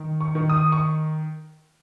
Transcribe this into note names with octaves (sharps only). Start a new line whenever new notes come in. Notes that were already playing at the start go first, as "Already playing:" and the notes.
Already playing: D#3
C#6
D#3
D#6
C#6